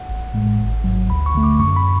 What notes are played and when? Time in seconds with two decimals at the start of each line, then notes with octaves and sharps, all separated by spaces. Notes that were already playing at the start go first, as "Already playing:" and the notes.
Already playing: F#5
0.09 A1
0.34 A2 G#3
0.59 G#1
0.84 G#2 F#3
1.09 D2 B5
1.26 C#6
1.35 D3 A3
1.43 D6
1.60 F#2 C#6
1.77 B5